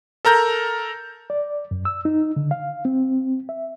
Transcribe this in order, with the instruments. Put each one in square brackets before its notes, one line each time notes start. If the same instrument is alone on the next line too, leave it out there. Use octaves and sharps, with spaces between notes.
[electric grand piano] A4 A#4 A#5 G6
[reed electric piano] D5
F#2
E6
D#4
D3
F5
C4
E5